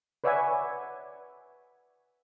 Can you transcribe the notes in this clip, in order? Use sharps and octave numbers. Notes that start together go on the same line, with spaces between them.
B4 C#5 D5 E5 F#5 G#5